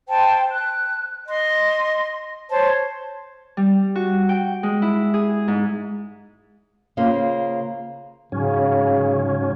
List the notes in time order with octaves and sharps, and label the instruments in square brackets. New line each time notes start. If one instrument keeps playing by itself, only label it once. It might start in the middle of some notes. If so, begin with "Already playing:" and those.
[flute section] C5 G5 A5
F#6
D#5 C6
C5 C#5 A5
[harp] G3
F#4
G5
G#3
E4
G#4
G#2
[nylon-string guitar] C#3 A#3 F4 C5
[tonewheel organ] G#2 F#3 C#4 [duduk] C#3